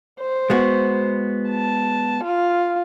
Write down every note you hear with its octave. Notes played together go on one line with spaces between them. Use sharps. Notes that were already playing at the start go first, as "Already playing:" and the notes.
C5
G#3 B3 F#4
A5
F4